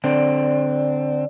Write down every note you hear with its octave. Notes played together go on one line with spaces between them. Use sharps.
D3 C4 D5